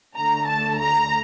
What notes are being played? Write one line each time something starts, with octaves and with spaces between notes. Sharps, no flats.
D2 D3 A3 A#5
A5
A#5